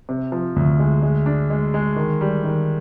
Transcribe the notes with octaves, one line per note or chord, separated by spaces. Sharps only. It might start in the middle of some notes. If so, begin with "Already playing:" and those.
C3
F3
D2
G#3
G#3
D4
G#3
G#3
D#3
G3
D#3